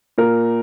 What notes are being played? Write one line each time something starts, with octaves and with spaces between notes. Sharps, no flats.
A#2 A#4